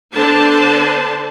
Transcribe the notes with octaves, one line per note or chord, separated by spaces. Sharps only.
D3 B3 D4 C5 A5